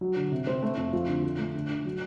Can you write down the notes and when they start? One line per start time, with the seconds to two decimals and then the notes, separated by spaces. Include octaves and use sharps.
0.01 F#3
0.16 D3
0.32 C3
0.47 C4
0.63 A3
0.77 F2
0.93 F3
1.08 D3
1.23 F3
1.39 A3
1.54 D3
1.70 D4
1.85 F#3